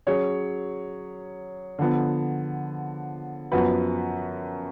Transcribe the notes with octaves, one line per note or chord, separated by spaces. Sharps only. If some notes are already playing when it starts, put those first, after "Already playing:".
F#3 C#4 G#4 C#5
D3 F3 B3
F#2 F3 B3 F#4 B4